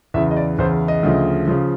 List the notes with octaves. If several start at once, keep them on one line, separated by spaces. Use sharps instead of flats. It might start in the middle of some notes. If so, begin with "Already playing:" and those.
E2 C#3 E3 E5
D#5
D5
E2 C#3 E3 C5
D#5
D2 C#3 F3
C#3 F3